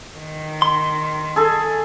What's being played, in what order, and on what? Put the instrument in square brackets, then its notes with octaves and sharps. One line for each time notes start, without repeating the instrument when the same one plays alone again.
[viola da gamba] D#3
[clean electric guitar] C6
[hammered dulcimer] G#4 A4